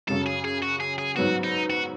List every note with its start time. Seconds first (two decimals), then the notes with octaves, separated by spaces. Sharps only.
0.08 F#2 C#3 F#3 C#4 A4
0.26 G#4
0.45 G#4
0.62 F#4
0.80 G#4
0.98 G#4
1.16 G#2 F#3 B3 F#4
1.44 D#4
1.70 F#4